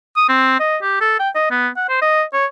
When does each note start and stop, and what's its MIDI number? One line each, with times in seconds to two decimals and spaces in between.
0.16 0.26 87
0.29 0.58 60
0.60 0.77 75
0.82 0.98 67
1.01 1.15 69
1.19 1.29 79
1.35 1.48 75
1.51 1.68 59
1.77 1.87 78
1.89 2.01 72
2.02 2.23 75
2.33 2.46 73